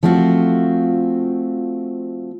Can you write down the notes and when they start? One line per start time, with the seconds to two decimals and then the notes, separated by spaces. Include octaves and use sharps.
0.03 F3 A3 C4 F4 F#4